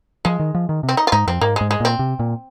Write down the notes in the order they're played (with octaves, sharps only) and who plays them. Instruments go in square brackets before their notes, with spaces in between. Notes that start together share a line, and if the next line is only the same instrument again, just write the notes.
[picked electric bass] F3 [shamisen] G#3
[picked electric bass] D#3
F3
D#3
C3
[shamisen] C4
D#4
F4
[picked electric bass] G#2 [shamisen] D#4
[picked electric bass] F2 [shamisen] C4
[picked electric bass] G#2 [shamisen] A#3
[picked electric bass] G#2 [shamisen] G#3
[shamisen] G#3
[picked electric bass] A#2 [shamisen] C4
[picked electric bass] C3
A#2